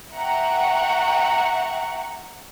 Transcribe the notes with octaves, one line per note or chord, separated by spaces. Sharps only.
E5 F#5 G5 A#5 C#6